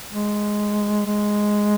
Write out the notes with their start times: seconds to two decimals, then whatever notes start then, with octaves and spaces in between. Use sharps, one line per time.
0.12 G#3
1.06 G#3